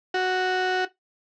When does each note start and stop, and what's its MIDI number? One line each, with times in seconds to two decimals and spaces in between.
0.14 0.85 66